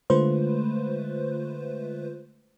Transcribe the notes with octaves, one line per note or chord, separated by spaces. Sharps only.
D3 G#3 A3 F4 B4 C5